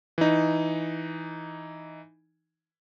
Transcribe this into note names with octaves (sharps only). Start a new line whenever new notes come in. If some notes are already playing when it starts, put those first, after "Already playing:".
E3 D#4